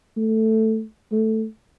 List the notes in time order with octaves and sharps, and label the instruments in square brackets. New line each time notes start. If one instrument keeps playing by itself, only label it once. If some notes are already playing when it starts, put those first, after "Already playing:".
[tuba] A3
A3